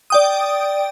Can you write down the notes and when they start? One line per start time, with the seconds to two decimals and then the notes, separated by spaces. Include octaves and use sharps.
0.10 D5 G5 D#6